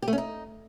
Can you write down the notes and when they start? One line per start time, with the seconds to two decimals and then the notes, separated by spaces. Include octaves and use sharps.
0.02 G4
0.08 A3
0.13 C#4
0.18 D#4